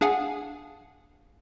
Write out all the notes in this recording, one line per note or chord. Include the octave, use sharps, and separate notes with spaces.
D4 G#4 F5 F#5 G#5